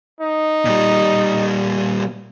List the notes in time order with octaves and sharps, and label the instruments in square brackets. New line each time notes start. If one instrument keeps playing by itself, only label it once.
[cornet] D#4
[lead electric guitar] A#2 G3